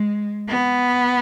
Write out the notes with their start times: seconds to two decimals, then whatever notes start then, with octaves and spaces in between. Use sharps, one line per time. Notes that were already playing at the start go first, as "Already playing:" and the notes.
Already playing: G#3
0.49 B3